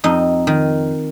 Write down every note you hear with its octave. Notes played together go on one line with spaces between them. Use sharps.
F2 D#4
D#3